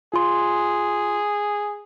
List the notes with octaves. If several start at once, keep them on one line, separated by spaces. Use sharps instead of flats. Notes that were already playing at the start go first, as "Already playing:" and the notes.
F4 G#4 C6